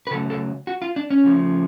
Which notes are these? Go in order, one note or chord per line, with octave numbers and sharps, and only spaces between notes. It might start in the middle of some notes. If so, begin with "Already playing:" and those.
B4
C#3 F#3 A3 A4
A4
F#4
F4
D4
C#4
C#3 F3 A3